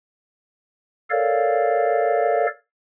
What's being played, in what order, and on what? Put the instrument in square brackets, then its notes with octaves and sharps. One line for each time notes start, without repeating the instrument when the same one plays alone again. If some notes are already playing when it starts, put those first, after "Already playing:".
[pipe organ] A4 A#4 C#5 D5 F5